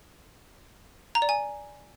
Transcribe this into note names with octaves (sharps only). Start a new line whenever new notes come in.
A#5
D5
G#5